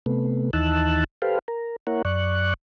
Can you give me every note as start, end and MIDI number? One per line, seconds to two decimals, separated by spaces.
0.06 0.51 48
0.06 0.51 57
0.06 0.51 59
0.53 1.04 39
0.53 1.04 52
0.53 1.04 63
0.53 1.04 81
0.53 1.04 88
0.53 1.04 90
1.22 1.39 67
1.22 1.39 69
1.22 1.39 71
1.22 1.39 72
1.22 1.39 77
1.48 1.76 70
1.87 2.02 58
1.87 2.02 64
1.87 2.02 70
1.87 2.02 73
1.87 2.02 78
2.05 2.54 42
2.05 2.54 74
2.05 2.54 85
2.05 2.54 90